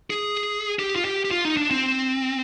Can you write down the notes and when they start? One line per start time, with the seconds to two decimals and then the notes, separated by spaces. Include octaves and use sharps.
0.10 G#4
0.79 G4
0.96 F4
1.05 G4
1.25 G4
1.31 F4
1.45 D#4
1.57 D4
1.71 C4